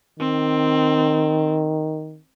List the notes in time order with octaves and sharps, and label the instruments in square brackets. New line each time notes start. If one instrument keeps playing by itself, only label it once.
[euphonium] D#3 [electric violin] C4